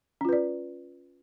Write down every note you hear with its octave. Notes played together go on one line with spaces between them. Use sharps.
C#4 F4 B4 D5